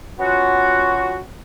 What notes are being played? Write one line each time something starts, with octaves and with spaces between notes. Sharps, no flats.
B3 C#4 F4 F#4